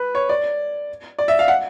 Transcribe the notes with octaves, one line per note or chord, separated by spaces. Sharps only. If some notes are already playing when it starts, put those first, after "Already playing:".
Already playing: B4
C#5
D5
D5
E5
F5
F#5